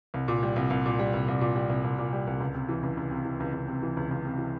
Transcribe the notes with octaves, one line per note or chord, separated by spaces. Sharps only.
C2
A#2
G3
C2
C2
A#2
G3
C2
C2
A#2
G3
C2
C2
A#2
G3
C2
C#2
C3
E3
C#2
C#2
C3
E3
C#2
C#2
C3
E3
C#2
C#2
C3
E3